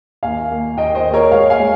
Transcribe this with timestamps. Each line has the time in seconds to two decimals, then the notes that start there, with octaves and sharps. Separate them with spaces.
0.23 D#2 F5 G#5
0.51 A#3
0.77 D#2 D#5 G5
0.95 C5 D#5
1.05 A#3
1.14 A#4 C#5
1.31 G#3 C#5 F5
1.50 F5 G#5
1.59 G#3